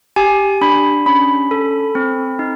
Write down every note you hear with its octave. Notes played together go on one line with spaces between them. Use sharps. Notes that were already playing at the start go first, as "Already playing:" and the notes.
G4 G#5
D4 B5
C#4 B5
A4
C4
D#4